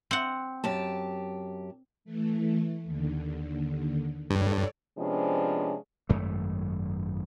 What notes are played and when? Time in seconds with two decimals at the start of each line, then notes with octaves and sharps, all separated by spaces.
0.11 C4 F#5
0.64 F#2 G4 A5
2.05 E3 A3
2.85 D#2 D3
4.30 G2 A4 C#5 D5
4.98 C3 F3 G#3 B3 C#4 D4
6.09 G#1 F#2 A3